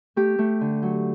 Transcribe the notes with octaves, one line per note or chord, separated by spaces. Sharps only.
A3 G4
A3
D3
F#3